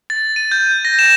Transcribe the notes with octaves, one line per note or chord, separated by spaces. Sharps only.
A6
D#7
G6
A#6
E7